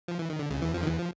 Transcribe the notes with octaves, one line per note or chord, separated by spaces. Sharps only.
F3
E3
D#3
D3
C#2 C#3
E2 E3
F2 F3
D#3
E2 E3
F3